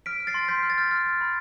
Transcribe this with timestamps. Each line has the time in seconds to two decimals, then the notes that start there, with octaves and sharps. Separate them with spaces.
0.06 F6 B6 D7
0.20 F6
0.27 A6 C7
0.34 C6
0.48 C6 G6 B6
0.63 F6
0.70 A6
0.78 F6
0.91 F6
1.06 F6
1.21 B5